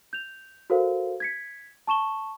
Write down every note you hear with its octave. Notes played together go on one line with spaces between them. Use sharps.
G6 F7
F#4 A4 A#4 C5 F5
G#6 B6 C#7
A5 C#6 E7 G7